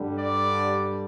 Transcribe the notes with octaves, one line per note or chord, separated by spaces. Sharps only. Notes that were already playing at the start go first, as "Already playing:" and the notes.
Already playing: G2 D3 G3
D5